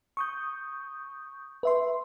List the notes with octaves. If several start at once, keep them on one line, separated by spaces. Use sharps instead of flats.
C#6 D#6 G6
B4 E5 C6